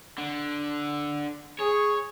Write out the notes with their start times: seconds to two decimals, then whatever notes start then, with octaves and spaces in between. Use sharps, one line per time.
0.18 D3
1.60 G#4 C#5